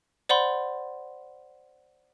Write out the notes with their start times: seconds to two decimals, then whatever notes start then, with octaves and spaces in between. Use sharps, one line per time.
0.29 C5 D5 F#5 B5 C6